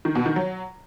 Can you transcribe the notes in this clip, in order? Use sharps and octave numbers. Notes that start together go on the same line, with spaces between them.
D#3
B2
D#3
F#3